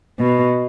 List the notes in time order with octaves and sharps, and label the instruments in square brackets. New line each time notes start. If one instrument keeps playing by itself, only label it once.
[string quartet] B2